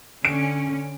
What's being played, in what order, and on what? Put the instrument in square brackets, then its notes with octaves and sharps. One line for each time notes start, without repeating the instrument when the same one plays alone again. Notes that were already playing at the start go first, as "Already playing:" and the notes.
[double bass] D3 [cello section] C#4 [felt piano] D7